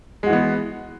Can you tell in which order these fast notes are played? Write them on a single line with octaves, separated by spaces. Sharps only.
G#3 F#4 E3 B3